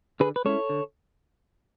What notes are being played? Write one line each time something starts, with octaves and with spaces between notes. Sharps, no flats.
D3 G#4 B4
B4
G#3 C#4 E4 A4 C#5
D3